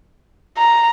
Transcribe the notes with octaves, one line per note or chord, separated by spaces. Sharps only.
A#5